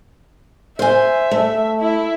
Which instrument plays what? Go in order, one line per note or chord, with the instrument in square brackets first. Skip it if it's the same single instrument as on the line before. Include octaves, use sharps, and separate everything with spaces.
[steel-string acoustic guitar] C5 G#5 [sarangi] E5
[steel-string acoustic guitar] A3
[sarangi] E4